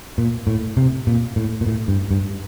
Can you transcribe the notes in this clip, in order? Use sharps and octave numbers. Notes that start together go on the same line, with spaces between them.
A#2
A2
C3
A#2
A2
A#2
A2
G2
G2